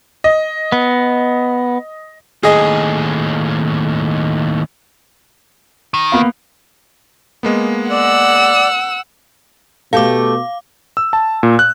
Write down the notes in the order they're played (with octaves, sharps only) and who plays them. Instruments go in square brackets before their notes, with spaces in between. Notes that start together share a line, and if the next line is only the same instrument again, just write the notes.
[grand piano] D#5
[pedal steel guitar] B3
[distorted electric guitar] D#2 A2 [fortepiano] G#4 D#5
[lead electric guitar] D#3
[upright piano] A#3 B3 F5
[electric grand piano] G#3 A#3 B3
[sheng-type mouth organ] D5 [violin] F#5 E6
[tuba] B2 [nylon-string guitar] A3 G4 A4 [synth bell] F5 D6
[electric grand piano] E6
A5
A#2
F#6